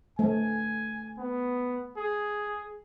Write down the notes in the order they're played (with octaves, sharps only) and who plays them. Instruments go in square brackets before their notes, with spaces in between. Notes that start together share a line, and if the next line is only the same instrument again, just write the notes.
[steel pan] A3 [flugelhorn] G#5
[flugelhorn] B3
G#4